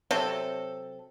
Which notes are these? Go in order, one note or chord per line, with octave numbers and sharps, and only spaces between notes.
C3 F#3 C4 A4